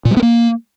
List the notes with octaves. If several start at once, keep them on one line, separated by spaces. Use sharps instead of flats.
A#2
G3
B3
A#3